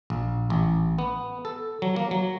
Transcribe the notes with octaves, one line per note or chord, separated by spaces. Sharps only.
A#1
A1
B3
A4
F#3
A#3
F#3